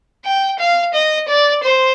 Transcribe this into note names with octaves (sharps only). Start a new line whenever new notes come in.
G5
F5
D#5
D5
C5